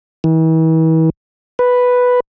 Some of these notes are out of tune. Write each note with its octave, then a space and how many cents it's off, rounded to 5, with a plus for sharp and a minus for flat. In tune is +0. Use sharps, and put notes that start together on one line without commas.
E3 -40
B4 +0